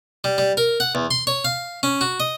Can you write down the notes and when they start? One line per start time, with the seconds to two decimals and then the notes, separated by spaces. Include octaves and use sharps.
0.24 G3
0.38 G3
0.57 A#4
0.80 F#5
0.95 E2
1.11 C6
1.27 C#5
1.45 F5
1.83 C#4
2.01 F#4
2.20 D#5